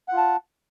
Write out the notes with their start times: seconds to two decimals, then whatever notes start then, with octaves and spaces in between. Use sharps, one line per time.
0.08 F#5
0.13 F4
0.18 A5